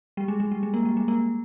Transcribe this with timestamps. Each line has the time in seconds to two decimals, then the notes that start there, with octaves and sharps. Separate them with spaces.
0.17 G3
0.28 G#3
0.40 G#3
0.52 G3
0.63 G#3
0.74 A#3
0.85 G3
0.97 G#3
1.08 A#3